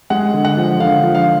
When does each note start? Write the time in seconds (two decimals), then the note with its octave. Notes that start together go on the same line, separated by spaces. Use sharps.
0.10 G#3 F#5
0.34 D3
0.45 F#5
0.57 F3
0.80 D3 F5
1.03 F3
1.15 F5